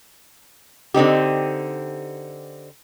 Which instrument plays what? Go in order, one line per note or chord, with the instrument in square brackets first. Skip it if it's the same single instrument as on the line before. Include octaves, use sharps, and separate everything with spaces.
[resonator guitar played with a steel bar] D3 C4 D#4 G4